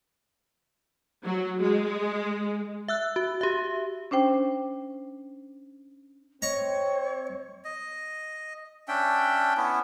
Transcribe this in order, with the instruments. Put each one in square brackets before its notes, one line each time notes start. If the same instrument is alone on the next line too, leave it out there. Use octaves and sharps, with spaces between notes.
[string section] F#3
G#3
[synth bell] E5 E6 F#6
F#4
G4 E5
[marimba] C#4 D4 C5 G5
[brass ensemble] C4 [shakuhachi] C#5 [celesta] D#5 [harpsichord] A#5 C#6
[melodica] D#5
C#4 D4 E5 G5
B3 C#4 E4